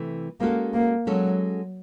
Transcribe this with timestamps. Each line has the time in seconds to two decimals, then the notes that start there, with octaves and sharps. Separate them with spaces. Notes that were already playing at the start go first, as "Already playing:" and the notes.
Already playing: C3 E3 A3
0.40 G#3 A#3 C#4 F#4 A4
0.74 A#3
1.07 F#3 G#3 C#4 F#4 A4